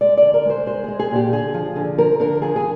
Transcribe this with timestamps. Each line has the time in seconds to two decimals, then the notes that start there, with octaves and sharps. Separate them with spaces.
0.01 G#3 D5
0.17 D3 D5
0.34 A#4
0.45 G#3 C5
0.66 G#3 C5
0.84 G#3 G#4
0.99 G#4
1.11 A#2 G4
1.33 D3 G#4
1.54 F3
1.76 D3
1.98 F3 A#4
2.20 D3 A#4
2.42 F3 G#4
2.56 G#4